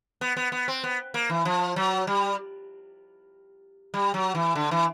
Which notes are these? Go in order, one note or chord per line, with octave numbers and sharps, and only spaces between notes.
B3
B3
B3
C4
B3
A#3
E3
F3
F#3
G3
G3
F#3
E3
D3
E3